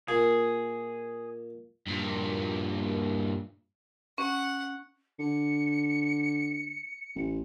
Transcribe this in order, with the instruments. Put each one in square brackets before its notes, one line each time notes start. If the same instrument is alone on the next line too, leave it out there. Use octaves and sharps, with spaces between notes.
[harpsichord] A#2 [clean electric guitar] G#4
[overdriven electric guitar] G2 A#2
[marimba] C#4 [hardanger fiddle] F#5
[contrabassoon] D3 [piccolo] C#7
[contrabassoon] A1